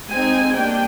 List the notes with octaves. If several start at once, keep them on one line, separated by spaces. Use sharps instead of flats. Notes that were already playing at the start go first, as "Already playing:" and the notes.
G#3 C4 D#4 G#5
G3 A#3 D4 G5